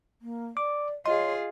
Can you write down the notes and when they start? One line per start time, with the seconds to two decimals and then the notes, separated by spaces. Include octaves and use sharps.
0.22 A#3
0.57 D5 D6
1.06 F4 G#4 C#5 D#5 C6